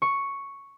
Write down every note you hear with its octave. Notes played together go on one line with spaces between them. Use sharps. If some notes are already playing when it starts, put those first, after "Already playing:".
C#6